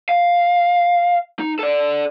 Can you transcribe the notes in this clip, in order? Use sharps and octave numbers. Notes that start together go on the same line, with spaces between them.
F5
D#4
A4 D5